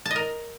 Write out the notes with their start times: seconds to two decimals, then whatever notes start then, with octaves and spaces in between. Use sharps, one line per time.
0.06 A5
0.11 D#5
0.16 A#4